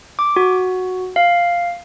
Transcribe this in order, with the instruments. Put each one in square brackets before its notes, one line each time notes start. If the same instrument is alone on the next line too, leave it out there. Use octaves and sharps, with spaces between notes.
[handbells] D6
F#4
F5